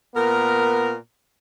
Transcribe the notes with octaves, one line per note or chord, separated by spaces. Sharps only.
A#2 B3 A#4